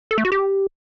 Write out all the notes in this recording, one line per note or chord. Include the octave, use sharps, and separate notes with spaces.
A4
A3
F#4
G4